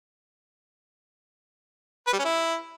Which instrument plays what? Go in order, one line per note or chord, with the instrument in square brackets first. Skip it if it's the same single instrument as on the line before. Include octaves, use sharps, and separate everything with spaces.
[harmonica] B4
G3
C#4
E4